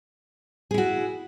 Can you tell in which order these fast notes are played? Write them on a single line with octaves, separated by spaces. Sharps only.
G#4 E4 F#4